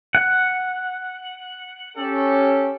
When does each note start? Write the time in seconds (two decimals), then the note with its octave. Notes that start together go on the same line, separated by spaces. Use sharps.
0.15 F#5
1.97 C#4 G4 A4